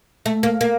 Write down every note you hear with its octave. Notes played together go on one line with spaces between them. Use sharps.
A3
A#3
A#3